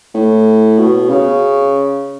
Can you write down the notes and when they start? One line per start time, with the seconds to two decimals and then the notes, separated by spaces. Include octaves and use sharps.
0.14 A2
0.78 B2
1.10 C#3